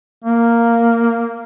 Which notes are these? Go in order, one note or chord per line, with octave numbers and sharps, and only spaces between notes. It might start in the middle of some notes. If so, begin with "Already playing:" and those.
A#3